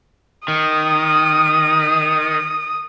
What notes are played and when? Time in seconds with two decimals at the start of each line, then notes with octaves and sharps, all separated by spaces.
0.48 D#3 D#6